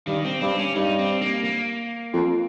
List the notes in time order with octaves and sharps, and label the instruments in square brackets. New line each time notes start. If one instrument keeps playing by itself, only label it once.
[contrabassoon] G2 [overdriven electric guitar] D#3
[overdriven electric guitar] C4
[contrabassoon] G2 [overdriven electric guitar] C4
[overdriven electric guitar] C#4
[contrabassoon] G2 [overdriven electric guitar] D#4
[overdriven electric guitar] C4
A#3
A#3
[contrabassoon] F2